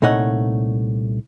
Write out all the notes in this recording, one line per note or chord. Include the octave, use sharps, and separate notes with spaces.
C2 A#2 A3 D#4 C#5 F#5